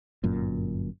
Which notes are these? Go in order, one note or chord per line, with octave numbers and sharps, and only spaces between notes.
G1 F#2 A#2